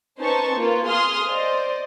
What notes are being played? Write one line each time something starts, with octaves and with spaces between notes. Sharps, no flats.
C#4 D#4 B4 C5 A5 C#6
A#3 F4 B4
G#4 F5 G#5 C6 D#6 F6
C5 D5 D#5